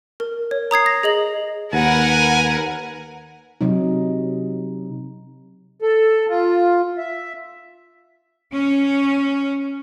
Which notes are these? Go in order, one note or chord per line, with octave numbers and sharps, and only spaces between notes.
A#4
C#5
A#5 D#6 G#6 C7
A#6
G#4 D#5 F#7
D#2 A#4 B4 F#5 G#5
C3 F#3 D#4
A4
F4
E5
C#4